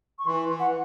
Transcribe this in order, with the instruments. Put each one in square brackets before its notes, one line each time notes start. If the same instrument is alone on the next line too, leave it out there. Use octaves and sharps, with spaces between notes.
[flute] C#6
[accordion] E3 [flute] C6
[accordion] E3
[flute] F#5